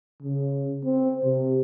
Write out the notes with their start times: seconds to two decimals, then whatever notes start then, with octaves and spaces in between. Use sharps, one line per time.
0.22 C#3
0.85 C4
1.24 C3